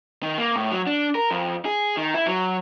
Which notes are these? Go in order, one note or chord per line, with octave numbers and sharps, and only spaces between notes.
D#3
A#3
A2
F#3
D4
A#4
F2
G#4
D#3
E4
F#3